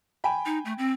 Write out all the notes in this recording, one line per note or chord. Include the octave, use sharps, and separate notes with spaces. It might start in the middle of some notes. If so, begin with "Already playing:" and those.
G5 G#5 B5
D#4
A3
C4